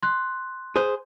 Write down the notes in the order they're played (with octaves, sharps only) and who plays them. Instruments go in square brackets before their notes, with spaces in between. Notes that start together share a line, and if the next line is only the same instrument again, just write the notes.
[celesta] C6 F#6
[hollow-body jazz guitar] G#4 C5